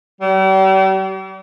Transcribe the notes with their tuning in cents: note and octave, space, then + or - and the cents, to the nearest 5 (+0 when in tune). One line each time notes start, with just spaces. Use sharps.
G3 -40